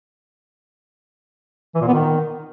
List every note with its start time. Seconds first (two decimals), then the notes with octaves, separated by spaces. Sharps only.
1.75 E3
1.81 A#2
1.87 B3
1.94 D#3